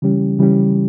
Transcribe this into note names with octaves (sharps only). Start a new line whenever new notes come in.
C#3 E3 G3 C#4 G4
C#3 E3 G3 C#4 G4